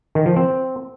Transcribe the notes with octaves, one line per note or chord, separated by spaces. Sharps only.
D#3
F3
C4